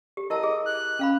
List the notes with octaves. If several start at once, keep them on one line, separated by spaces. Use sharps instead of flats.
G4
E4 A#4 D#5 A5
G#4
F#6
C#4 F5 B5